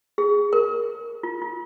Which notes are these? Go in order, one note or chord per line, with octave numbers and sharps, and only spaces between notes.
G#4
A#4
F4
F4